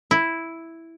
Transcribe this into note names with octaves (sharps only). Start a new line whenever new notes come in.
E4